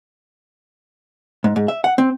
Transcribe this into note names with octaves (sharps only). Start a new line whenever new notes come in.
G#2
G#2
E5
F#5
C4